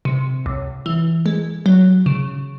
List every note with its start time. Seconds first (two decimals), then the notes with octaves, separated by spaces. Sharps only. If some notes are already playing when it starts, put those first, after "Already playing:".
0.05 C3
0.46 C#2
0.86 E3
1.26 G#3
1.66 F#3
2.06 C#3